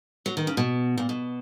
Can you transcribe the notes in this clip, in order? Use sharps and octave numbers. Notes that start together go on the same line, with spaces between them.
F#3
D#3
C#3
B2
A#2
B2